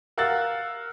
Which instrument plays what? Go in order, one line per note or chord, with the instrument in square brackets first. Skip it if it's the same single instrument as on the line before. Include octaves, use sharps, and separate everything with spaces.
[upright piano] A#4 F5 F#5 E6 F#6 A6